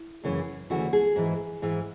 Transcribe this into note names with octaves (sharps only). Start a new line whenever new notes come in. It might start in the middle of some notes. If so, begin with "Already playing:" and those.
Already playing: E4
F#2 C#3 E3
D2 C#3 E3 F#4
G#4
G#2 E3
G#2 E3